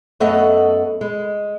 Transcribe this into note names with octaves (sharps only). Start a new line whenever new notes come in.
F#2 A3 B3 A4 D#5 F#5
G#3